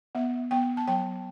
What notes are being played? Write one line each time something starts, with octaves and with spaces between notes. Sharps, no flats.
B3 E5
B3 G5
A5
F#3 G5